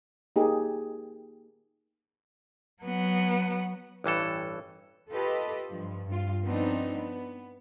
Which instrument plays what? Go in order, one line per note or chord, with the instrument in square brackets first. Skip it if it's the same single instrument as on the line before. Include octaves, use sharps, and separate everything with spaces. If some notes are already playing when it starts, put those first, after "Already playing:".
[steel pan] A#3 D#4 G4 G#4
[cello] F#3 B3
[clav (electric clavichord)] A1 G2 E3 A4
[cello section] F4 G4 A4 B4 D#5
G2 F3
G2 F4
F3 B3 C4 D4 D#4
B3